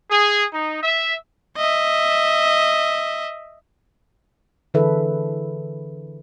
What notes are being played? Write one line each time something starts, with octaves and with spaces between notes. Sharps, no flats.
G#4
D#4
E5
D#5 E5
D3 E3 G#4 A4 B4 E5